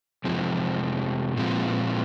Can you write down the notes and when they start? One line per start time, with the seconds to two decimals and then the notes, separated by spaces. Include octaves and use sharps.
0.24 F2 C3 F3 G#3
1.36 A#2 F3 G#3 C4 F4